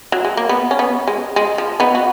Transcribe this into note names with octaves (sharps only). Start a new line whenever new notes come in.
F#3
G#3
A#3
B3
C#4
B3
G#3
G#3
F3
B3 D#4
F#4